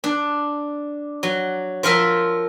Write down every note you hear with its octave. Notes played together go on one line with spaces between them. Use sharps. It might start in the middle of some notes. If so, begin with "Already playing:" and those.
D4
F#3
F3 F4 A#4 E5